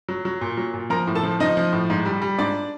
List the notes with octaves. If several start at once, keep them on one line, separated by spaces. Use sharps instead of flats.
F#3
F#3
A#2
F#3
A#2
F3 A#4 A#5
A2
A4 A5
F3
F3 D#4 D#5
F3
A2
G#2
G3
G3
G#2 D4 D5